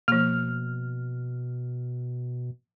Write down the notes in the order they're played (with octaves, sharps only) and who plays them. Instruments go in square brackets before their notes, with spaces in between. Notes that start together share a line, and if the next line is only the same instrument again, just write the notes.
[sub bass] B2 [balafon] F3 A#3 [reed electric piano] F6